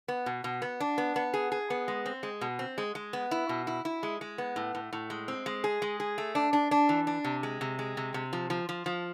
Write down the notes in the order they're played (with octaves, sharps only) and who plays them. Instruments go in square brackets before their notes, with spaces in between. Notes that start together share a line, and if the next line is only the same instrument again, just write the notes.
[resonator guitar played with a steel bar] B3
B2
B2
B3
D4
B3
B3
G#4
G#4
B3
G#3
C4
G#3
B2
C4
G#3
G#3
B3
E4
B2
E4
E4
G#3
G#3
B3
A2
A2
A2
G#3
C4
G#3
G#4
G#3
G#4
A3
D4
D4
D4
E3
D4
C3
G#3
C3
G#3
C3
C3
F3
F3
F3
F3